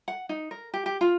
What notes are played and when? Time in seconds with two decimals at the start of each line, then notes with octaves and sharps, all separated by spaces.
0.08 F#5
0.29 D#4
0.51 A#4
0.74 G4
0.86 G4
1.01 F4